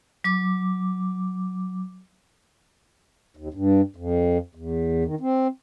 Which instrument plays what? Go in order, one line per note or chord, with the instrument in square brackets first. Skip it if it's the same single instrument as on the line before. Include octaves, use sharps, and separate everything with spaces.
[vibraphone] F#3 D6
[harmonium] D#2
G2
F2
E2
D#3
C4